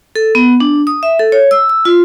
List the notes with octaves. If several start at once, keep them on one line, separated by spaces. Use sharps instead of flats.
A4
B3
D4
D#6
E5
A4
C#5
E6
E6
F4